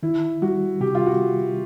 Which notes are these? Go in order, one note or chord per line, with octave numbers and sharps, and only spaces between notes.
D#3 E4
G3 F#4
C3 G4
F4
F#4